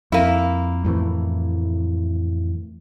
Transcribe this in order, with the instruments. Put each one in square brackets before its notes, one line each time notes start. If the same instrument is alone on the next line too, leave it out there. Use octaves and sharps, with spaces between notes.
[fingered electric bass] F2 [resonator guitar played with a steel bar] A#3 E4
[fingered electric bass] F2 A2 E3